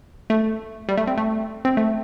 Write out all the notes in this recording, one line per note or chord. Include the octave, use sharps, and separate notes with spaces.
A3
G3
A3
C4
A3
C4
A3